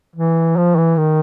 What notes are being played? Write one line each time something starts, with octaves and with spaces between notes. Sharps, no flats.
E3
F3
E3
D#3